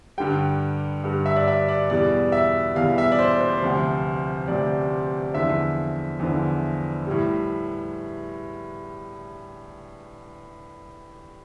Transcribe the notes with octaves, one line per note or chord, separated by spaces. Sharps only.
G2 D3 G3 G5
G2 D3 G3
E5
D5
E5
D5
E2 B2 G3 D5
E5
E2 B2 G3 F5
E5
D5
C5
C5
D2 C3 F3
D2 C3 F3 D5
E2 D3 F3 E5
E2 D3 F3
A2 G3